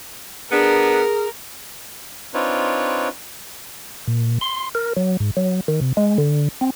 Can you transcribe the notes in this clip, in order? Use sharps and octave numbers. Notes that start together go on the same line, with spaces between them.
B3 D4 G#4 A#4
C4 D4 D#4 F4 B4 C#5
A#2
C6
A#4
F#3
G#2
F#3
D#3
C3
G#3
D3
C4